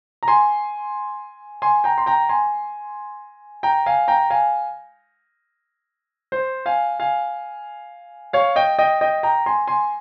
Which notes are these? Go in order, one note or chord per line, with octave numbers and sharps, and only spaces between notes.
A#5
G#5 C6
G#5 C6
G5 A#5
C6
G5 A#5
G#5 C6
G5 A#5
F5 G#5
G5 A#5
F5 G#5
C5
F5 G#5
F5 G#5
C#5 F5
D#5 G5
D#5 G5
D#5 G5
G5 A#5
G#5 C6
G#5 C6